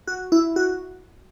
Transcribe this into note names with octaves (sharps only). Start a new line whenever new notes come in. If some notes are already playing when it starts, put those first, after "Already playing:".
F#4
E4
F#4